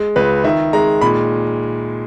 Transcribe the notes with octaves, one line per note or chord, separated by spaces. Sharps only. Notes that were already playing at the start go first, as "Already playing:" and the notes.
Already playing: G#3
C#2 B4
D#3 E5
G#3 A#5
A#2 B5